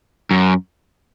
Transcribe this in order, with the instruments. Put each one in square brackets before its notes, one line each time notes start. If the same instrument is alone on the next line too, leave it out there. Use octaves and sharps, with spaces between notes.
[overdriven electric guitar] F#2